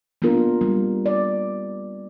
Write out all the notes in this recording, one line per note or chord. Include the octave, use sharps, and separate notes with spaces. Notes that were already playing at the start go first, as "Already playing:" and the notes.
A#3 B3 D4 F4 A#4
G3
D5